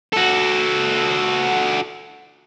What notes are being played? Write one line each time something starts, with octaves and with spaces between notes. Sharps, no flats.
F#4 A4